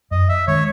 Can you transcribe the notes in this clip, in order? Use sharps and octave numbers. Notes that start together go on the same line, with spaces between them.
F#2 D#5
E5
D#3 G#3 C#4 C#5